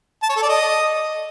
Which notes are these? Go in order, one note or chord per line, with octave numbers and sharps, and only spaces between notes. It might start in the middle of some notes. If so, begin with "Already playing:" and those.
A5
C#5
A4
D5
D#5